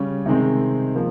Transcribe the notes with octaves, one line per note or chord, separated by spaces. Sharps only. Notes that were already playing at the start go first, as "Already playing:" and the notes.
Already playing: C#3 G3 C#4
C3 D#3 G#3 C4
F3 A#3